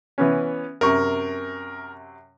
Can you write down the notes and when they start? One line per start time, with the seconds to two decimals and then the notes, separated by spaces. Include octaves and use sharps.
0.18 E3 B3 C#4
0.81 F#2 C3 A#4 C#6